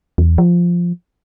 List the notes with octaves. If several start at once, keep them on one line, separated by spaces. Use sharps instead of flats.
E2
F3